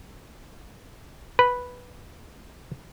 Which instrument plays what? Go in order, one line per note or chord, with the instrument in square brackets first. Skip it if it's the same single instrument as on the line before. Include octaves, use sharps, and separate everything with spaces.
[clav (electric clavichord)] B4